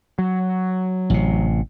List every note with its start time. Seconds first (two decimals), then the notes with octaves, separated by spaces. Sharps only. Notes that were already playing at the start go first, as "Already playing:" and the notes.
0.19 F#3
1.10 A1 C3